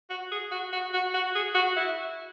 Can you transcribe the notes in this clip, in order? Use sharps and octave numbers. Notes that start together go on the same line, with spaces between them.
F#4
G#4
F#4
F#4
F#4
F#4
G#4
F#4
E4